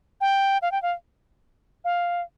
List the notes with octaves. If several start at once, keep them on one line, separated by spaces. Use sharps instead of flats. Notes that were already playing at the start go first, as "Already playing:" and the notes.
G5
F5
G5
F5
F5